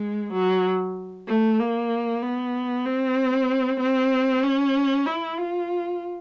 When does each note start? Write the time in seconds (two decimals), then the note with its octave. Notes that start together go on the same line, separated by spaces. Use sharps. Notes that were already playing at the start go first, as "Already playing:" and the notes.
Already playing: G#3
0.33 F#3
1.28 A3
1.59 A#3
2.22 B3
2.85 C4
3.80 C4
4.43 C#4
5.06 E4
5.38 F4